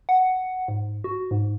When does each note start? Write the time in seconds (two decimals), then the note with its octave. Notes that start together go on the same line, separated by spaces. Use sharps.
0.09 F#5
0.68 G#2
1.04 F#4
1.31 G#2